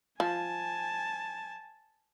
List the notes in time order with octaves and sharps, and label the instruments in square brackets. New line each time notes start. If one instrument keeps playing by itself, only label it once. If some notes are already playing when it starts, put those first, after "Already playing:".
[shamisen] F3 [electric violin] G#5 A5